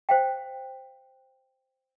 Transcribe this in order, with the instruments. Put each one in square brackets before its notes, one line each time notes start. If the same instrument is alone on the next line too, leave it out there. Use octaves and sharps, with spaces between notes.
[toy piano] C5 F5 G5